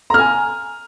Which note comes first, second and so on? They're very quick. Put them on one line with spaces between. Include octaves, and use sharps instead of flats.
A#5 F6 G#5